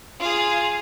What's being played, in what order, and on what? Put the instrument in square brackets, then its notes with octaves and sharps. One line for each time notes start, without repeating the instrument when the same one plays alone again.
[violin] F4 G#4